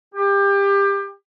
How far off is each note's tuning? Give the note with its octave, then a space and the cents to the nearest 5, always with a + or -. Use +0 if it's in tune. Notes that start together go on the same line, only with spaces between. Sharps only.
G4 +25